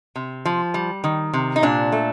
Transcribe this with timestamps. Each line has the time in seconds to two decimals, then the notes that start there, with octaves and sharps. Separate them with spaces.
0.16 C3
0.45 F3
0.74 G3
1.04 D#3
1.33 C3
1.56 D#4
1.63 A#2 D4
1.92 A3